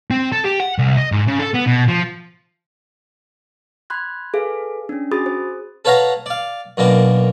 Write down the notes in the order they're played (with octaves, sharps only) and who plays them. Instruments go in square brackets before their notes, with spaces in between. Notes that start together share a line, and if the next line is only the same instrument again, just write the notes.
[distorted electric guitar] C4
A4
G4
F#5
C2
D#5
G#2
C#3
A4
B3
B2
F3
[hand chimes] B5 C6 F#6 G#6
G#4 A4 B4 F5
C#4 D4
F#4 G#4 B5 D#6 A6
C5
[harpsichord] A4 B4 C#5 F5 F#5 A#5
D5 F5
F#2 B2 A#3 D4